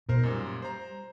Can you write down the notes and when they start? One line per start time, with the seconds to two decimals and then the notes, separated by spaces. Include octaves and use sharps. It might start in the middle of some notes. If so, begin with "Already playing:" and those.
0.09 B2 D#4 A#4 C5
0.23 F#2 A#2 G3
0.62 C5 A#5